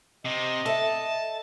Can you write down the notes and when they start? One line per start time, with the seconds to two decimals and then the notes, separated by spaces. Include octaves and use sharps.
0.25 C3 D#5
0.66 A4 E5 A5